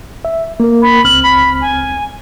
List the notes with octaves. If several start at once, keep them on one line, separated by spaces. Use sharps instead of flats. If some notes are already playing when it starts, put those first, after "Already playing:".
E5
A#3 A#4
B5
C#2 C4 F6 F#7
B5
G#5